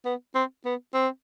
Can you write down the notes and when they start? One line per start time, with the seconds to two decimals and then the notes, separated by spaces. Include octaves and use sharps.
0.05 B3
0.35 C4
0.66 B3
0.94 C4